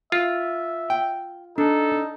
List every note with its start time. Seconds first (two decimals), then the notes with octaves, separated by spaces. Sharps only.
0.12 F4 E5
0.90 G5
1.58 D4 D#4 A4